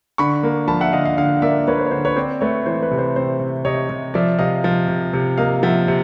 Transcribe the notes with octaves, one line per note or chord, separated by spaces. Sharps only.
D3 B5 C#6
A#3
F3 A5 B5
E5 F#5
D3 D#5 F5
D#5 F5
D3 D#5 F5
A#3 D5 E5
A#3 B4 C#5
C5
C#5
D3 C5
B4 C#5
C4 C5 D5
A3 B4 C#5
E3 C5
B4
C3
C5
C4 C5
C3
C3 C#5 D#5
C3
F3 D5 E5
C3 D#5 F5
F3
C3
C3
A#3 D#5 F5
F3 E5 F#5
C3